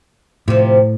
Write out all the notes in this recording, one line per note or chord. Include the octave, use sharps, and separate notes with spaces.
A2 C3 F3